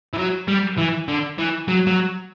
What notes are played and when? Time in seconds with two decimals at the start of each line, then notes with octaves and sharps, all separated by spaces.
0.14 E3
0.18 F#3
0.48 G3
0.78 E3
1.08 D3
1.38 E3
1.68 F#3
1.87 F#3